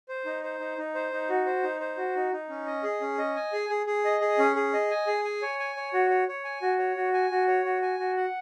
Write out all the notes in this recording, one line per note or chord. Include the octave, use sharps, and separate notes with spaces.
C5
D#4
C5
D#4
D#4
C5
D#4
F#4
C5
D#4
C5
F#4
D#4
D#4
C#4
D#5
G#4
C#4
D#5
G#5
G#4
G#4
G#4
D#5
G#4
C#4
G#4
D#5
G#5
G#4
G#5
C#5
G#5
C#5
F#4
C#5
C#5
G#5
F#4
C#5
F#4
G#5
F#4
C#5
F#4
G#5
F#4
F#5